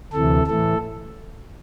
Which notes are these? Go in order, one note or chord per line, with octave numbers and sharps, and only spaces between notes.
D2 C3 E3 A4
A2 E3 A4